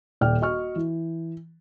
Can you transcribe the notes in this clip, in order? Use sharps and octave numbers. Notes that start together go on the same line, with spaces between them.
D#1 D5 G5 F6
F#4 D#5 C#6 F6
E3